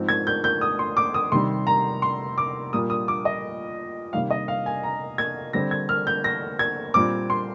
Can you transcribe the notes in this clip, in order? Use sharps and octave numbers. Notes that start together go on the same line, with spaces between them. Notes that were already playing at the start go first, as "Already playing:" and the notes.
Already playing: G#2 F3 C4
G#6
G6
G6
D#6
C6
D6
D#6
C3 D#3 G3 C6
A#5
C6
D6
A#2 G3 A#3 D#6
D#6
D6
D#5
C3 D#3 G3 A#3 F5
D#5
F5
G#5
A#5
G#6
D3 G3 C4 A#6
G#6
F6
G6
A#6
G#6
A#2 G3 C4 D6
C6